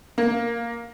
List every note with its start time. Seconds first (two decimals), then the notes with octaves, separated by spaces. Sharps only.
0.18 A#3